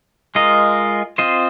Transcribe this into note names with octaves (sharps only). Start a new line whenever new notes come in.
G#3 F4 A#4 D#5
C4 F4 C5 D#5